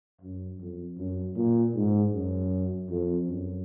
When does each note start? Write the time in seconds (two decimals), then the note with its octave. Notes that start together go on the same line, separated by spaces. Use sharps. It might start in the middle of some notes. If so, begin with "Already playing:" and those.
0.21 F#2
0.60 F2
0.98 F#2
1.36 A#2
1.75 G#2
2.13 F#2
2.89 F2
3.28 F#2